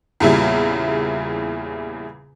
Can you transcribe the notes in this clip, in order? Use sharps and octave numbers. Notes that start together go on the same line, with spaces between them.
E2 A#2 C#3 G3 E4